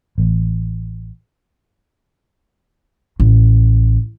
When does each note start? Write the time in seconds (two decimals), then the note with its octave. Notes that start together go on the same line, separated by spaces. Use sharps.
0.18 A1
3.20 A1